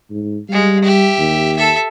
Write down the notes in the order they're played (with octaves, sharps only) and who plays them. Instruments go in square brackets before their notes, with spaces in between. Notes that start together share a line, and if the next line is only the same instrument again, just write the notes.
[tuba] G#2
[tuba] G3 [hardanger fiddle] G#3 F5
[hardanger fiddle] G4 E5
[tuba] D#2
[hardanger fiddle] A4 E5